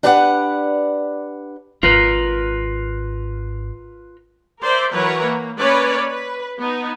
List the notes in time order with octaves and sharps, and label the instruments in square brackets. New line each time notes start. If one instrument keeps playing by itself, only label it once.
[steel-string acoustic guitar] D4 G4 B4 D5 F5 F#5
[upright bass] G#1 [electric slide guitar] F4 A#4 B4
[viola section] A#4 C5 D5 E5
E3 F#3 A#4 B4 C#5 F#5
A#3
A#3 C#4 B4 C#5 D5 B5
B4
B3 D#4